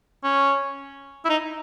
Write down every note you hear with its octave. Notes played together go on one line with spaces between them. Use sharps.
C#4
E4
D#4